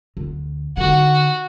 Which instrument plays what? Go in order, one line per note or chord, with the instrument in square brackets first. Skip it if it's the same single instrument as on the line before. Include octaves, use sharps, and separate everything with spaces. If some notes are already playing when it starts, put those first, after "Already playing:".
[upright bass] D2
[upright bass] D3 D#4 [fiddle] F#4